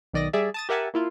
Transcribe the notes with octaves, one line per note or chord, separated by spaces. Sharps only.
B1 D#3 D5 D#5 A#6
G3 G#4 D5 E5
A5 D#6 A6
G4 A#4 E5 F#5 G#5 A5
A#3 E4 F4